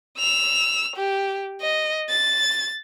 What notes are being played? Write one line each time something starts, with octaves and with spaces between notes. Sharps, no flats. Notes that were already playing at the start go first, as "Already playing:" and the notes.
E6 F7
G4
D#5
A6